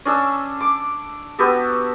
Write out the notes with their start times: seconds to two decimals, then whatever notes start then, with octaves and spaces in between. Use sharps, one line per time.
0.05 C#4 D4 A4 E6
0.61 D6
1.39 B3 F#4 G4 A4